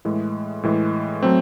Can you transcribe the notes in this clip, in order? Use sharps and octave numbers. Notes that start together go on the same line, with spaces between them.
A2 E3 G#3
A2 E3 G#3
F#3 A3 C4